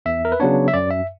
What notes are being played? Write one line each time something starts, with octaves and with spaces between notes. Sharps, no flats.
E2 E5
A#4
B4
C#3 F#3 B3 D4 C#5
E5
F#2 D5
E5